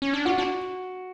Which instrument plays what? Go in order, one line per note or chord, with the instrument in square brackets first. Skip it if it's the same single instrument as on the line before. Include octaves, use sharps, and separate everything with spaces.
[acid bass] C#4
D4
[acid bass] F4 [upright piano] F#4
[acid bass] D4